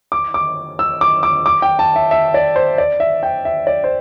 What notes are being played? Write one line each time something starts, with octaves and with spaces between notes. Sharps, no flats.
D6
D6
E6
D6
D6
D6
G5
A5
E5
E5
D5
C5
D5
E5
G5
E5
D5
C5